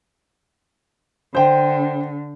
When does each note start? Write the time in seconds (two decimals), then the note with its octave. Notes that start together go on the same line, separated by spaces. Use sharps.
1.35 D3 C5 G5